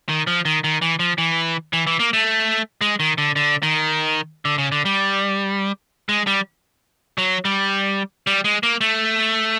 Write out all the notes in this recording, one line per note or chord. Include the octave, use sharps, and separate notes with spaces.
D#3
F3
D#3
D#3
E3
F3
E3
E3
E3
A#3
A3
G#3
D#3
D3
D3
D#3
D3
C#3
D3
G3
G#3
G3
F#3
G3
G3
G#3
A#3
A3